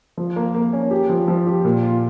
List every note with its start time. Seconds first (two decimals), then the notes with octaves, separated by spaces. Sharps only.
0.18 F3
0.36 A#3
0.54 A#3
0.73 C#4
0.91 G4
1.09 F3
1.28 F3
1.47 G4
1.65 A#2
1.83 F4